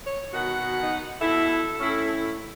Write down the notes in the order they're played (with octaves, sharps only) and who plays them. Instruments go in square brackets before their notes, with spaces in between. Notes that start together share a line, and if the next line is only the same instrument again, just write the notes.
[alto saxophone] C#5
[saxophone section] B2 D#3 F#5 [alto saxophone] F#4
[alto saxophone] D#4
[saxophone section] B2 E4 [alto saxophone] A4
[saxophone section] A2 C#4 E4